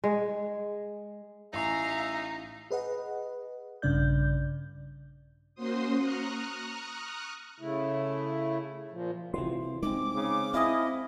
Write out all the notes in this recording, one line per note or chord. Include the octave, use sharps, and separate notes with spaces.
G#3
A1 D#4 E5 F5 G#5 A#5 C#6
G#4 B4 D#5 F#5
A#1 G2 C#3 D4 D5 G6
A#3 C#4 F#4 C5 C6 D#6
A#5 C#6 D#6 F6 F#6
C#3 A3 E4
A#2 F3
C3 E3 F4 F#4 C6
G#3 C4 D#4 D6
C#3
C4 E4 D#5 F5 G#5 D#6